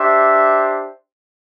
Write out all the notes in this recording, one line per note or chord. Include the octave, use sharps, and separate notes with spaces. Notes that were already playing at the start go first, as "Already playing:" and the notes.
Already playing: D4 G4 C5 E5